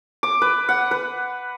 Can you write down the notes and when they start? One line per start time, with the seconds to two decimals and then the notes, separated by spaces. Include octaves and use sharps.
0.23 D6
0.42 B4
0.69 F#5
0.91 B4